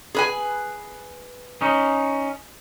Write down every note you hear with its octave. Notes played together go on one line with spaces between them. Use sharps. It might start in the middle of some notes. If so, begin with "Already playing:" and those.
G#4 B4 G#5
C#4 D#4